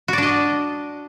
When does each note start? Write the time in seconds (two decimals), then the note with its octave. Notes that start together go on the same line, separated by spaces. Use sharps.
0.08 F#4
0.13 D5
0.18 D4
0.23 D#5